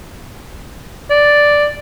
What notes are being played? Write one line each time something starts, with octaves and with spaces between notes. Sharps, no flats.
D5